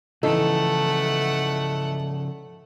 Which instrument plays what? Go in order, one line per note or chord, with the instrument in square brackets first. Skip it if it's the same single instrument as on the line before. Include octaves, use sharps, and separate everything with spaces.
[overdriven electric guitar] C#3 F3 [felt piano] E3 D#4 [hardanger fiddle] A3 F#5 [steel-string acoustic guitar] A4